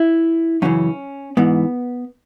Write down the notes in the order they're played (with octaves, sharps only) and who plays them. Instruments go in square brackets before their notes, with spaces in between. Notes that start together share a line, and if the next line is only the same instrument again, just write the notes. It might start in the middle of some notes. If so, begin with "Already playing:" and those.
Already playing: [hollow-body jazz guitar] E4
F#2 C#3 E3 C#4
G#2 E3 B3